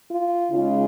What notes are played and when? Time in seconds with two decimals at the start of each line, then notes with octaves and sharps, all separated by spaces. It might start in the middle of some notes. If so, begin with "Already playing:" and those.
0.10 F4
0.52 C#3 G#3 D#4 F4